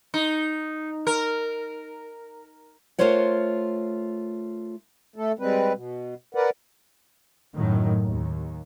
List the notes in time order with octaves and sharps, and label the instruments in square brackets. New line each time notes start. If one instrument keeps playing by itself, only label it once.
[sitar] D#4
A#4
[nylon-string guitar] A3 F4 A#4 C5 C#5 F#5
[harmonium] A3 A4
G3 G#3 C4 B4
B2
A#4 B4 D5 F#5
[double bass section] F#2 A2 D#3 F#3
D#2